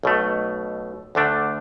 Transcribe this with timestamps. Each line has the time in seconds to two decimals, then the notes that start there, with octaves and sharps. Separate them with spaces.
0.03 B1 B2 A3
1.15 D2 D3 A3 D4